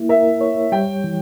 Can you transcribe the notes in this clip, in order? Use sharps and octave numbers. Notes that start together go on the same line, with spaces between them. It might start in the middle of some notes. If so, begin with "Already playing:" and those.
Already playing: A#3 E4
A#4 E5
C#5
G3 G5
E3